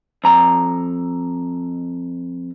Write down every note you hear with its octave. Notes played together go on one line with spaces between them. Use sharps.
F2 A#5